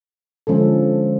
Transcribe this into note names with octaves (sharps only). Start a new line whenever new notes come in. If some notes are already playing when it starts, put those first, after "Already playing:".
D3 F3 G#3 C#4 A4